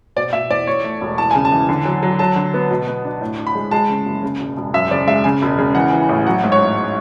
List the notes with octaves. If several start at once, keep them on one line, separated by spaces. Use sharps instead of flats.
B2 D5
B2 E5
E2 D5
E2 C#5
A3
E1
E2 A5
C#3 G#5
A5
E3
D3
F#3
F#3
F#3 A5
D3
B3
B2
B3
D4
A2
D4
B5
G#3
G#3 A5
C#3
F#1
C#3
E1
E1
F#2 E5
C#3 D5
G#3 E5
C#3 G#5
E1
C#3
E3 F#5
E3
A1
F#3 F#5
G#2
C#5
A1